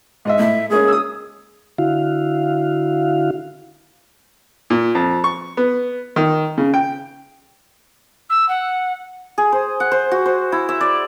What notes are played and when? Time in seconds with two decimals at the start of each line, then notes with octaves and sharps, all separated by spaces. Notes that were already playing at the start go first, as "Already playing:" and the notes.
0.25 G#2 D#5 E5
0.39 A2 E5
0.70 G#3 A#3 C#4 G#4
0.88 D#6 E6
1.78 D3 E4 F#4 F5
4.70 A#2
4.95 F2
5.24 C#6
5.57 B3
6.16 D#3
6.58 C#3
6.74 G5
8.29 E6
8.48 F#5
9.38 G#4
9.52 C5
9.80 F#5
9.92 C5
10.11 F#4
10.26 C5
10.52 E4
10.69 E5
10.81 D5